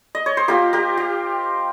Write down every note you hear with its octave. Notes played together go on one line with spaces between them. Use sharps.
D#5
C#5
C5
A#3 F4 G4 A#4
G4 A#4
G4